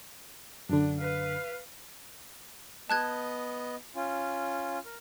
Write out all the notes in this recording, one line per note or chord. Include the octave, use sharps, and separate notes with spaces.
F#2 D3 D4
B4 F5
B3 D#5 A5 F#6 G#6
C#4 F4
A#4